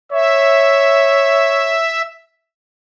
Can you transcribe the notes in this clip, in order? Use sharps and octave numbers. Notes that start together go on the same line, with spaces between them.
C#5 E5